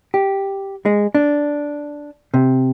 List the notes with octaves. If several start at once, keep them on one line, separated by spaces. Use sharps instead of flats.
G4
G#3
D4
C3